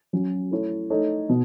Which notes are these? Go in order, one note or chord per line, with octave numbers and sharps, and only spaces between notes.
F#3 C#4 F#4
A3 E4 A4 C#5
A3 D#4 A4 C#5
B2